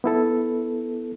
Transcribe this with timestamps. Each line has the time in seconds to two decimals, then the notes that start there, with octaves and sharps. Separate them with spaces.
0.04 B3 E4 A4